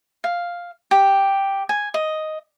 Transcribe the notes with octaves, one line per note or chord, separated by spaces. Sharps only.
F5
G4
G#5
D#5